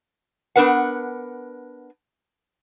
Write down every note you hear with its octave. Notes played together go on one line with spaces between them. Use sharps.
B3 D4 A#4 B4 F#5